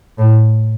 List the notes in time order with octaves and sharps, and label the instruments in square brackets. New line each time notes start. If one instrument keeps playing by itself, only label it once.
[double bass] A2